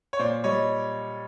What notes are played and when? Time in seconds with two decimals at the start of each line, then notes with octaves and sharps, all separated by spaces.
0.13 C#5
0.19 A#2 C5 D5
0.44 G3 C#5 D#5